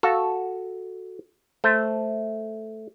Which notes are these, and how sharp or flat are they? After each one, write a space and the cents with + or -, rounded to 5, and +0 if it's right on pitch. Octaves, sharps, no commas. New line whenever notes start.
F#4 +0 A4 +0 F5 +0
A3 -5 C5 +0